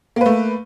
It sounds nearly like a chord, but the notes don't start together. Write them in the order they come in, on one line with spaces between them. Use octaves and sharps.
A#3 B4 A3